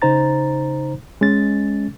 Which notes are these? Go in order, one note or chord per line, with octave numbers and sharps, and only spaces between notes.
C#3 D#4 C5 A#5 A6
G#3 C#4 A6